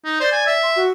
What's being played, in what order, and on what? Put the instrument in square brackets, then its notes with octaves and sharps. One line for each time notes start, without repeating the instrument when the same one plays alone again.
[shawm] D#4
[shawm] C5 [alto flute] D5
[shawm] G#5
E5
[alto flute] C6
F#4